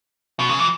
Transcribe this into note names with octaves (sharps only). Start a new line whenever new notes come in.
B2
C#3
E3